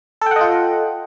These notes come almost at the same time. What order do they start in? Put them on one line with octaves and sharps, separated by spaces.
A4 G5 F#5 D#5 F4